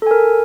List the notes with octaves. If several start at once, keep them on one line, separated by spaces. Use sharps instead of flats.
A4 A#4 G#5